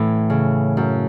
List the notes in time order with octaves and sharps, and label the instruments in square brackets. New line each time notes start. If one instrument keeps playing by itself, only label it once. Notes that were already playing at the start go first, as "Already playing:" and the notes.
Already playing: [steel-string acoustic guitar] A2 [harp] E3
[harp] C#3
F#2